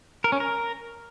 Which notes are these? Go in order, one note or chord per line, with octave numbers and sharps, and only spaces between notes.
A#4
C#4
A#4